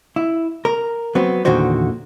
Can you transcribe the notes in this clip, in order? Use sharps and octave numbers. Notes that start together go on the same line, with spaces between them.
E4
A#4
F#3 B3 C4
E2 A#2 D3 D#3 F#4 C5